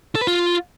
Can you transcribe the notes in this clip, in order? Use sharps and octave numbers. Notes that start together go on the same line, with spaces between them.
A4
B4
F4